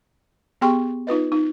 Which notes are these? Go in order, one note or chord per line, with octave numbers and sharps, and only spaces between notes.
B3 G4 G#4 G5 C6 C#6
D#4 F4 B4 D#5
D#4